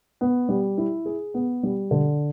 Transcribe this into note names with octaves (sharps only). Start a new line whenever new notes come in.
B3
G3
E4
G#4
B3
G3
D3